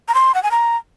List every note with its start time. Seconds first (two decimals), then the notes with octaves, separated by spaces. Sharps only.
0.08 A#5
0.14 C6
0.35 F#5
0.43 G#5
0.51 A#5